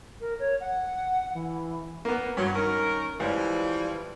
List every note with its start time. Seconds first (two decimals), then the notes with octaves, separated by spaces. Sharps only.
0.20 A#4
0.39 C#5
0.60 F#5
1.34 E3
2.05 A#3 B3
2.37 G2 F#3
2.53 D#3 C#4 A#4
3.20 C#2 E3 F3 G3